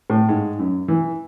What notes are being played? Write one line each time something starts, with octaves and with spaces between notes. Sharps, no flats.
A2
G#2
F#2
E3